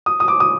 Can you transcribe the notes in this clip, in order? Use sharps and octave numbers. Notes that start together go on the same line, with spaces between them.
D#6
D#6
D6
D#6